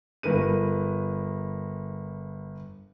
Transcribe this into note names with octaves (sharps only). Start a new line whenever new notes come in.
G1 A#4 B4 D#7